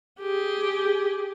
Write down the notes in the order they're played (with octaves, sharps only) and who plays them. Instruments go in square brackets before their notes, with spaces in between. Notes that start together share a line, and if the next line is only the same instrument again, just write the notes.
[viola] G4 G#4